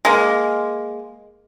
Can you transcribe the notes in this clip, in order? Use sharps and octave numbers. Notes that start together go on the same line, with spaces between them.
G#3 A#3